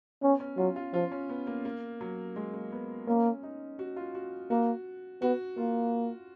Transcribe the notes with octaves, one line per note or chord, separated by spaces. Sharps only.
B3 C#4
C#4
F#3 F4
F4
F3 F4
C#4
B3
A#3
A#3
F#3
G#3
A#3
B3
A#3 C#4
D#4
F#4
F4
F#4
A#3 F#4
B3 F#4
A#3 F4